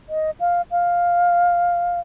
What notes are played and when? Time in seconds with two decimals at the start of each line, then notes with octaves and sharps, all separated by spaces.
0.09 D#5
0.40 F5
0.71 F5